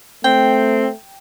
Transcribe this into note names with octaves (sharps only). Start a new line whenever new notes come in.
A3 C4 G5